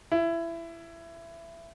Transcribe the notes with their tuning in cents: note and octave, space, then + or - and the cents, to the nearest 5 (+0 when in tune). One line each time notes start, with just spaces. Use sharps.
E4 +20